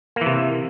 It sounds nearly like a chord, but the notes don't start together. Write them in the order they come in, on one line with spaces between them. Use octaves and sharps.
A#3 E3 C3